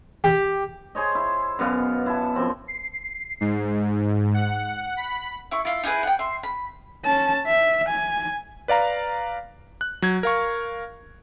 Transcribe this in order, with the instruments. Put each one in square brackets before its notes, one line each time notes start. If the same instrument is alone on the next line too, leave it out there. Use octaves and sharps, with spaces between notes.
[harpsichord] G4
[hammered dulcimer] G#4 C5 C#5 D#5
E4
F#2 B2 B3 F5
E4 A5
F#2 F3 C4
[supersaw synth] C7
G#2
F#5
B5
[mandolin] E4 C#6
E4 F4
D#4 E4 G#4 B4
F#5 G5
E5 C6
B5
[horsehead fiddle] C#4 A5
E5
G#5
[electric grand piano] B4 D5 F5 A#5
F#6
F#3 G#6
A#4 F5 C#6